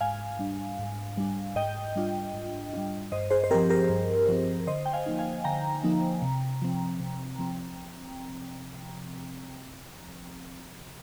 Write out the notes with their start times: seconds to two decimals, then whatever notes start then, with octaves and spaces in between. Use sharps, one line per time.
0.01 G#2 F5 G#5
0.39 G3 D4
0.79 G#2
1.17 G3 D4
1.56 G#2 D#5 G5
1.96 G3 D4 F4
2.34 G#2
2.73 G3 D4 F4
3.12 G2 C5 D#5
3.31 G#4 C5
3.44 C5
3.51 F3 C4 G4 A#4
3.69 G4 A#4
3.89 G2
4.28 F3 C4
4.67 D3 C5 D#5
4.86 G5
4.93 F5 G#5
5.06 F3 A#3 D#4
5.19 F5 G#5
5.44 D3 G5 A#5
5.84 F3 A#3 D#4
6.22 C3
6.62 F3 C4
7.00 C3
7.39 F3 C4